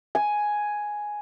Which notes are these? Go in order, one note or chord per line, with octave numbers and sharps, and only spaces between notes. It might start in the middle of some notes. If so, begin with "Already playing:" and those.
G#5